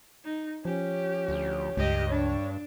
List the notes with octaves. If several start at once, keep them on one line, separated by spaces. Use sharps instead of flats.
D#4
F3 C#4 G4
D2
C#2 G2 G4 D#5
D4 C#5